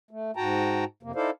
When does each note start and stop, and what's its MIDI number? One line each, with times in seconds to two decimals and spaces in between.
0.11 0.31 57
0.36 0.85 44
0.36 0.85 66
0.36 0.85 79
0.36 0.85 81
0.36 0.85 82
1.03 1.12 41
1.03 1.12 48
1.03 1.12 58
1.15 1.30 63
1.15 1.30 64
1.15 1.30 69
1.15 1.30 72
1.15 1.30 74
1.15 1.30 77